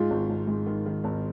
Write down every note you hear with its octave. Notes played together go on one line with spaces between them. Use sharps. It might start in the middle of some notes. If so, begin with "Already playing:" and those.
Already playing: G#2 F4
G#1
G#1
G#2
D#3
D#3
G#1